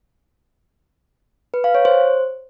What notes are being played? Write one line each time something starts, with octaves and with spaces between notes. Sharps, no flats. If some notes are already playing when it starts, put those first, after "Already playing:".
B4
F5
C#5
C5